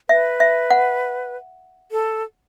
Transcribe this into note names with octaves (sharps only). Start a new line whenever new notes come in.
B4 E5
E5
F#5
A4